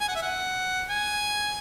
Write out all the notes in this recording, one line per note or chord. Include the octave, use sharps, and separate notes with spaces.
G#5
F#5
E5
F#5
G#5